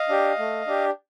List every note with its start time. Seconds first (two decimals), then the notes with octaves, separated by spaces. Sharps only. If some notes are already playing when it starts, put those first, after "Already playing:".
Already playing: D#5 F5
0.09 D4 G4
0.39 A3
0.67 D4 G4